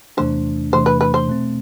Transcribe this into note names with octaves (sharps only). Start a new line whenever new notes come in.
E2 C3 E3 A3 D4 C5
E2 C3 E3 A3 D4 C5
B4
B4
C5
B2 A3 C4